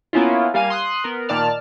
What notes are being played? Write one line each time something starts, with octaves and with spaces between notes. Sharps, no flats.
A#3 B3 C#4 E4 F4
G3 A#3 F5 G#5 D#7
C6 D#6 F#6
B3 A#4
A#2 D#3 D5 A5 F6